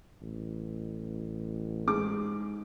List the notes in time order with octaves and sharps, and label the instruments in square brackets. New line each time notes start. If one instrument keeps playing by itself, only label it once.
[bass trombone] A1
[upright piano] G#2 G#4 D6